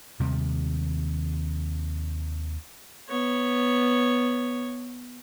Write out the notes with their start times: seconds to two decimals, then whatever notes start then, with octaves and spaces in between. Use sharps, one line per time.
0.20 D#2 C3 D#3 G3
3.09 B3 C#5